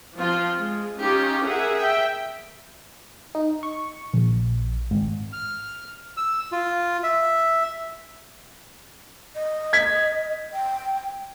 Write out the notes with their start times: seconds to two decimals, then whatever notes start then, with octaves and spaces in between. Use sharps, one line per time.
0.18 F3 C4 F4
0.57 G#3
0.98 C#4 D#4 F4 G4
1.45 G#4 A#4 E5 F#5
1.74 E5 G5
3.35 D#4
3.63 C#6
4.14 A#1
4.91 G#1
5.33 F6
6.17 E6
6.52 F4
7.04 E5
9.35 D#5
9.73 G#6 B6
10.53 G5